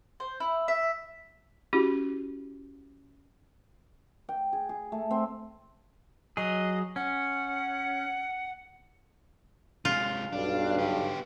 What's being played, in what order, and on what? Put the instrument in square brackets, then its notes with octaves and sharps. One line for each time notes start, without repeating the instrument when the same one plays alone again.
[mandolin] C5
E4
E5
[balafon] C#4 E4 F#4 G4
[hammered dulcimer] G5
G#4
G#4
A3
C4
[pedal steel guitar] F#3 G#4 [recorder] D#5
[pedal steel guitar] C#4 [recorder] F#5
[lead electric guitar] C3 G#3 [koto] F4
[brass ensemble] B1 G2 F5 [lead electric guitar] D4
[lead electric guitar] B3 G4